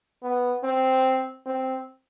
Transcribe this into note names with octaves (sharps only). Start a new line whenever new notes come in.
B3
C4
C4